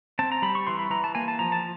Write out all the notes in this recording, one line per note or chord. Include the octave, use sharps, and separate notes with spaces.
C4 A5
A#5
G3 B5
C#6
E3 C6
B5
E3 A#5
A5
A#3 G#5
A5
F3 A#5
A5